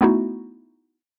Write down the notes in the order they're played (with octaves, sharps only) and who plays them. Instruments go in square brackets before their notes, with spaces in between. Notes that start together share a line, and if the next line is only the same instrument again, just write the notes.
[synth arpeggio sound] A3 B3 D#4 E4 F#4